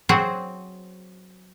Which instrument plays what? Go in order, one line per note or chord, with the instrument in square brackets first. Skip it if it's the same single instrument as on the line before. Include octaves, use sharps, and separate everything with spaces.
[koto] F#3 C4 F#4 G#4